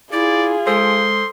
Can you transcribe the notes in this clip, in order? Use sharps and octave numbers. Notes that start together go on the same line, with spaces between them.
E4 F4 G#4 D5
G#3 A4 C5 C6 D#6